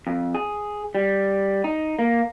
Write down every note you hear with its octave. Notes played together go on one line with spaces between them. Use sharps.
F2
G#4
G3
D#4
A#3